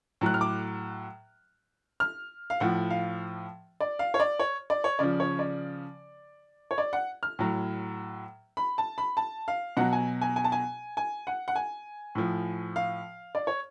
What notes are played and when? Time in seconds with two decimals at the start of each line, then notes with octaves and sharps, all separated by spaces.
0.21 A2 F#3 F#6
0.34 F6
0.41 D6
2.00 F6
2.50 F5
2.60 A2 F3 F#5
2.90 F5
3.81 D5
3.99 F5
4.14 C#5
4.20 D5
4.39 C#5
4.70 D5
4.84 C#5
4.99 C#3 F3 D5
5.20 C#5
5.39 D5
6.71 C#5
6.78 D5
6.93 F#5
7.23 F6
7.39 A2 F#3
8.57 B5
8.78 A5
8.98 B5
9.17 A5
9.48 F5
9.77 B2 F#3 F#5
9.93 G#5
10.22 G#5
10.36 G#5
10.44 A5
10.52 G#5
10.97 G#5
11.27 F#5
11.48 F#5
11.56 G#5
12.15 A2 F3
12.76 F5
13.35 D5
13.47 C#5